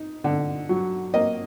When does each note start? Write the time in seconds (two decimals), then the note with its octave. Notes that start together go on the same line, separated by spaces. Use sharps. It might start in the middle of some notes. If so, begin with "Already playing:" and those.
Already playing: D#4
0.24 D3
0.69 F#3
1.14 A#3 D#5